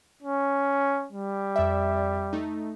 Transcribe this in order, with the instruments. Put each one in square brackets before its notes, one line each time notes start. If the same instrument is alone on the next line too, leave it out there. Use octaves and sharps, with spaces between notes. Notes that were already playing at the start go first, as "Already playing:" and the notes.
[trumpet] C#4
G3
[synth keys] F2 D5 E5
A3 D#4